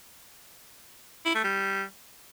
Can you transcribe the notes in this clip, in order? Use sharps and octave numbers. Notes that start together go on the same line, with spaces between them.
E4
A3
G3